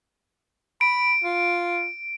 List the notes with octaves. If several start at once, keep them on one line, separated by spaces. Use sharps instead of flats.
B5 D7
F4